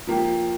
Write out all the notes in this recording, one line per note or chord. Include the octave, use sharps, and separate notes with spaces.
F3 A#3 G4